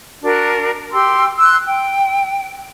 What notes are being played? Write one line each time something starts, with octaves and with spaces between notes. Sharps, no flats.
D4 F#4 A#4
G4 G5 C6 E6
C6 E6 F#6
G5